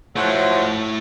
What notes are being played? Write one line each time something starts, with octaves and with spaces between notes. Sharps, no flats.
F3 F#3 A3 E4